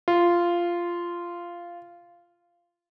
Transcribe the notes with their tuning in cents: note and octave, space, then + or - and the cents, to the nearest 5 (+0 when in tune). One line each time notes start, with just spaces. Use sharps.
F4 -10